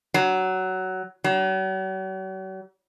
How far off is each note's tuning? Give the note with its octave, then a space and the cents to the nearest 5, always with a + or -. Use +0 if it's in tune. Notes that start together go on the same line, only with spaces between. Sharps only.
F#3 +15
F#3 +45